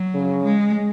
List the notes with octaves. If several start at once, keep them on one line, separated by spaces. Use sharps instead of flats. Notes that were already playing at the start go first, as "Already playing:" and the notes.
Already playing: F#3
C#3
G#3